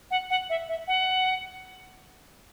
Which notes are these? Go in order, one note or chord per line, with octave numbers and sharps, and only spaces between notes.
F#5
F#5
E5
E5
F#5